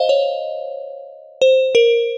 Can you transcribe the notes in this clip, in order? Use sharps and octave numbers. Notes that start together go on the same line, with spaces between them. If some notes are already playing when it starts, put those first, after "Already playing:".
Already playing: C5 D#5 F5
C#5
C5
A#4